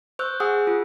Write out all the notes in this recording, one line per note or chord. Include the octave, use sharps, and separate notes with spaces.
C5 C#6 E6 F#6 G6
G#4 F#5 G#5 D#6 E6
F4